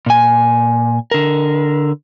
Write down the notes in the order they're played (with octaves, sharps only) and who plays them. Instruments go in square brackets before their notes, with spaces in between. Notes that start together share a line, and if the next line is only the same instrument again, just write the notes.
[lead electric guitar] A#2 G#5
D3 A#4